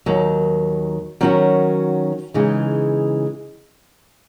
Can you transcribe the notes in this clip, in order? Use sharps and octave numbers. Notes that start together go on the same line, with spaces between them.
D#2 D#3 F#3
D#3 F#3 C#4 F#4
C#3 E3 G#3 D#4